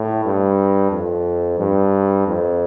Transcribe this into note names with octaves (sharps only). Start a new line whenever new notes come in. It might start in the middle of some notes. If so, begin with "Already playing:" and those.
Already playing: A2
G2
F2
G2
F2